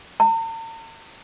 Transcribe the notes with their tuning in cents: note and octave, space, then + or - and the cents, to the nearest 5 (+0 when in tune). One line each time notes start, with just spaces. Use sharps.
A#5 -45